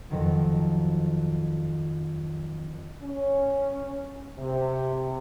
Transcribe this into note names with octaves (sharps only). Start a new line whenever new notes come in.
F2 D#3 F#3
C#4
C3